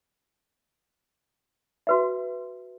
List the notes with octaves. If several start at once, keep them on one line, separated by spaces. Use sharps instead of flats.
F#4 B4 E5